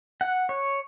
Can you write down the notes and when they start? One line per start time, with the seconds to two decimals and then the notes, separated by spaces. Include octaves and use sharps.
0.21 F#5
0.49 C#5